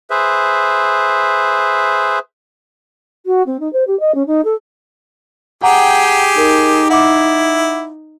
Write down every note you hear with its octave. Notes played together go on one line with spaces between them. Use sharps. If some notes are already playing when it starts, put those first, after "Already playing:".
G#4 B4 C5 E5
F#4
C4
D#4
C5
G4
D#5
C#4
D#4
A4
G4 G#4 F#5 G5 A#5
D#4 A#4
E4 F#5 D6